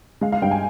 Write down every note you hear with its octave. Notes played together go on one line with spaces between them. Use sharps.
G#3 F5
F5
G2 G5
G#5